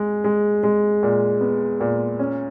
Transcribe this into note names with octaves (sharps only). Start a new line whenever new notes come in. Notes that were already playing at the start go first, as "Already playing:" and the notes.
Already playing: G#3
G#3
G#3
A#2
B3
A#2
C#4